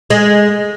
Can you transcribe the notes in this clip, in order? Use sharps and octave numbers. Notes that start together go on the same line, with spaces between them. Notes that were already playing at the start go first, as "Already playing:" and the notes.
G#3